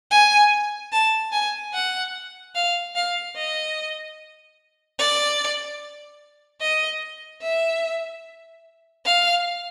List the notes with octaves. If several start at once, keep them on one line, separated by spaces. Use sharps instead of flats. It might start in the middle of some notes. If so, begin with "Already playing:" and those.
G#5
A5
G#5
F#5
F5
F5
D#5
D5
D#5
E5
F5